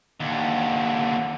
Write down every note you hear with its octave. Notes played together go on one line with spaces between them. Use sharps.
D#2 D3